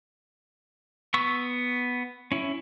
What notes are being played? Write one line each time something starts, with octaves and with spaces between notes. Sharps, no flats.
B3 C#6 E6
C#4 E4